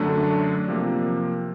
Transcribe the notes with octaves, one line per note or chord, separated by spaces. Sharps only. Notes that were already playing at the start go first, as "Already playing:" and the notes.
Already playing: F#2 D3 F#3 A3 D4
C3 F3 A#3